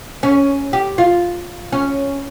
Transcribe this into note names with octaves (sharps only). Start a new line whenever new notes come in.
C#4
G4
F4
C#4